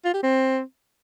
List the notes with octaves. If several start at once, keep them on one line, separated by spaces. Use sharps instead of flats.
F4
G4
C4